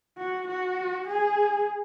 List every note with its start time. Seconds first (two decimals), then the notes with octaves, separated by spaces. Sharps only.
0.18 F#4
0.48 F#4
1.08 G#4